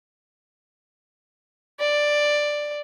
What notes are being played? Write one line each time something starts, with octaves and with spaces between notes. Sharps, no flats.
D5